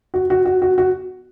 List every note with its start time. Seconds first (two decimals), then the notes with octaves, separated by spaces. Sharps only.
0.14 F#4
0.30 F#4
0.45 F#4
0.62 F#4
0.78 F#4